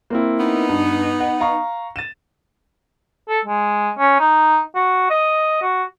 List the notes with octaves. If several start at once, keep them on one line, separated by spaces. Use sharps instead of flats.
A#3 C4 E4
B3 D#4
G2
F#5
F5 A#5 C#6
A6 D#7 E7
A4
G#3
C#4
D#4
F#4
D#5
F#4